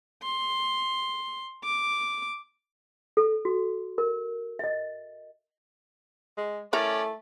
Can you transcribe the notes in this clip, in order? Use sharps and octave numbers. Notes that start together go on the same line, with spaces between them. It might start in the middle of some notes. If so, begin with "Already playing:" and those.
C6
D6
A4
F#4
A#4
D#5 E5
G#3
A3 C#4 E4 A4 A#4 D5